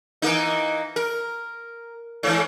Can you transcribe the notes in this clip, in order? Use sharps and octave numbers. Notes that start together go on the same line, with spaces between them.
E3 A#3 D#4
A#4
G#2 E3